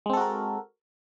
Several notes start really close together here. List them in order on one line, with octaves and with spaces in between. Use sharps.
G#3 C4 A4 F#4 A#4